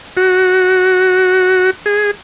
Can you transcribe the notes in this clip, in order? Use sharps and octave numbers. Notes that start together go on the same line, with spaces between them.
F#4
G#4